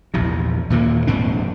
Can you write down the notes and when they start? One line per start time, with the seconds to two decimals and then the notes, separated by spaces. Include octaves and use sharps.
0.14 A#1 E2 C3
0.70 D#2 A#2 E3 A#3
1.07 F1 G#2 C4 D4